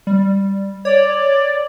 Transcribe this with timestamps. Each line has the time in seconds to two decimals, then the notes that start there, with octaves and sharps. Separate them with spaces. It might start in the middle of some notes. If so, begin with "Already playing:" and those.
0.07 G3
0.85 C#5 D5